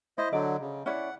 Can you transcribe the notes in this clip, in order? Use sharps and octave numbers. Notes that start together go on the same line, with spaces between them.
E4 C5 D#5
D3 F#3 D5 D#5
C#3
C#4 E4 D5 F#5